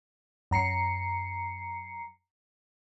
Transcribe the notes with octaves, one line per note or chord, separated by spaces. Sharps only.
F#2 A#5 C7 C#7